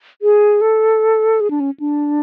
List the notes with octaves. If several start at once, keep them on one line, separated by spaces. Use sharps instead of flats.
G#4
A4
G#4
D4
C#4
D4